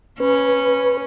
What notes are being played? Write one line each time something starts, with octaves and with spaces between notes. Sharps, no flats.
C#4 B4